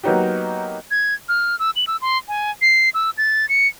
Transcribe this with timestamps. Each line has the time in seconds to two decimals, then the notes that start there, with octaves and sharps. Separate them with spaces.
0.04 F#3 A#3 B3 D#4 F#4 G4
0.91 G#6
1.29 F6
1.59 E6
1.76 F#7
1.87 E6
2.02 C6
2.28 G#5
2.62 C7
2.94 E6
3.18 A6
3.49 C#7